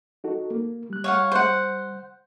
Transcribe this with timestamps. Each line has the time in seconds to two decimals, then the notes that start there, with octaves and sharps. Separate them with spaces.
0.24 D#4 F#4 A4
0.50 A#3
0.90 G3 F#6
1.04 C#5 F5 F#5
1.32 C5 F#5